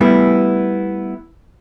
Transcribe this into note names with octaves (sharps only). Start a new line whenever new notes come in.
G3 A3 B3 E4